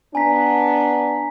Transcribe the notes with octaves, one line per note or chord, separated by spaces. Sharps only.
B3 D4 G#5 A#5 B6